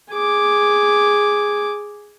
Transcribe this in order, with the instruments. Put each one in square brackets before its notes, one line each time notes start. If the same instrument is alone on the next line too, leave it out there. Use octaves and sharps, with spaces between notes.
[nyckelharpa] G#4 D6